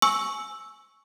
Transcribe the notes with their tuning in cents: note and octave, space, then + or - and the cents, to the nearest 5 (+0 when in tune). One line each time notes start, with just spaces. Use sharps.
G#5 +25 C#6 +0 E6 +0